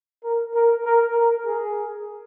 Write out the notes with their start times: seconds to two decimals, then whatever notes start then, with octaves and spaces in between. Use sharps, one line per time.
0.24 A#4
0.54 A#4
0.85 A#4
1.15 A#4
1.46 G#4